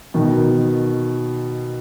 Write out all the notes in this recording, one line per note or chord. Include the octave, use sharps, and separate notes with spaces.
B2 D#3